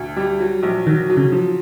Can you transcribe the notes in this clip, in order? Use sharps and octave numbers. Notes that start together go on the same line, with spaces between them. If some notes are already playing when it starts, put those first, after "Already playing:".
Already playing: D2
G3
F#3
A#1
D#3 F#3
F#3
C#3
F3